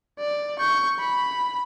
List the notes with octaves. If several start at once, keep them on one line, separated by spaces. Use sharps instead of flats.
D5
C#6 G6
B5